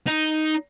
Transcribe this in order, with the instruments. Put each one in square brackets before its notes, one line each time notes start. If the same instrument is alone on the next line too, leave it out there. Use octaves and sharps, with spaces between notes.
[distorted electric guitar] D#4